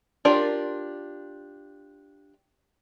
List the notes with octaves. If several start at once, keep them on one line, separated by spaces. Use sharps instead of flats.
D4 F4 G4 A#4 D5